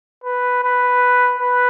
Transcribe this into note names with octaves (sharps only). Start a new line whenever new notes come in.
B4
B4
B4